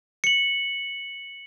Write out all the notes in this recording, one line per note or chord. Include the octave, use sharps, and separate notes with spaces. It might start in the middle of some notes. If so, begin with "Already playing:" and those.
C#7 F#7